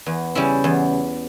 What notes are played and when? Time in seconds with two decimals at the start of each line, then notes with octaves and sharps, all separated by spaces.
0.06 E2
0.35 C#3 G3 C#4 E4
0.64 E2